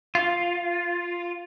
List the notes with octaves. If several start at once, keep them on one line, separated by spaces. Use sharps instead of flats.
F4